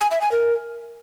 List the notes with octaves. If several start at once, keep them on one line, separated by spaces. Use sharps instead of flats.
G#5
E5
G#5
A#4